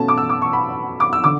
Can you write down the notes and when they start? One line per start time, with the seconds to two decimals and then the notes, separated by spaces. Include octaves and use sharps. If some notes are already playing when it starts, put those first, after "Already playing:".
Already playing: B2 A3 C#4 A5
0.08 D6
0.18 E6
0.29 D6
0.42 C#6
0.53 B5
1.00 D6
1.13 E6
1.24 D3 D6